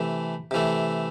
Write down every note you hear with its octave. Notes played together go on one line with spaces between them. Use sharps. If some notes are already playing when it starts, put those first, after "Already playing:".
Already playing: C3 E3 A3
C3 E3 A3